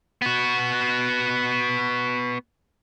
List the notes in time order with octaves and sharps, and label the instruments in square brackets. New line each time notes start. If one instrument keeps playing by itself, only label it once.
[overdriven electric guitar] B3 F#4